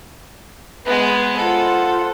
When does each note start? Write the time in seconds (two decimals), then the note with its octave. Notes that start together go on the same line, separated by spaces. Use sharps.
0.86 G#3 B3 B4
1.37 F4 A4 C5 F#5